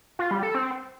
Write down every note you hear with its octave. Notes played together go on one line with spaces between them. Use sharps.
F4
G3
A4
C4